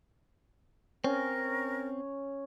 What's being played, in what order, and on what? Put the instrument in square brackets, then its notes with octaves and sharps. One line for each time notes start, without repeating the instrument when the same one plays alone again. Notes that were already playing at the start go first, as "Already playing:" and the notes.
[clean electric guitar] C4 [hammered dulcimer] C#4 [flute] A#4